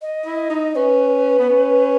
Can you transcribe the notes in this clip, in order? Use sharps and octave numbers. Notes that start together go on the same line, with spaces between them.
D#5
E4
D#4
C#4 B4
B3
C#4